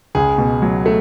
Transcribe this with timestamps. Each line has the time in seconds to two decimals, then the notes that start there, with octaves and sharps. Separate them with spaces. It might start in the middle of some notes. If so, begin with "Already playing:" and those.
0.15 C#2 G#4
0.38 B2
0.62 F#3
0.86 A3